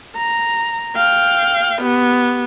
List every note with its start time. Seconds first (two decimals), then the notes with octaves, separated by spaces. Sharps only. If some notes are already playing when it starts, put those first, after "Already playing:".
0.16 A#5
0.96 F5 G5
1.82 B3 G4